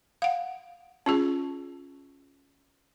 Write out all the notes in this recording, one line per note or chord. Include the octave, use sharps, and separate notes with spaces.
F5 F#5
C#4 F4 G#4